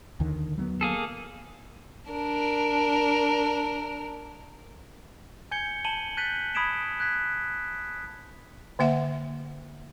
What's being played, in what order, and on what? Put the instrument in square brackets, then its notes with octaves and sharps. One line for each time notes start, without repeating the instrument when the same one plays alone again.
[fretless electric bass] D#2 D3 D#3
F#3 A3 B3
[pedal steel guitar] A#3 G#4 A4
[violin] D4 A#4
[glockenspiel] G#5 G6 G#6 C#7 G7
A5 D#7 F#7 G7
F#6 G6 A6 B6 D#7 F#7
B5 D#6 G#6 B6 D7 E7
F#6 G#6 B6
[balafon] D3 A#3 E5 F#5